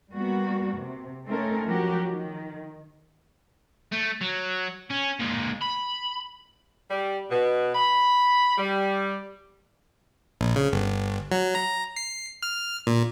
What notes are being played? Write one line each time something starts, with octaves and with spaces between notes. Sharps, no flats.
G3 A#3 B3 F#4
C3
A3 C4 C#4 D#4 A4 A#4
F3 F#3 F#4 G4 A#4
D#3
A3
F#3
C#4
A#2 G#3
B5
G3
B2
B5
G3
A#1
C#3
G1
F#3
A#5
C7
F6
A#2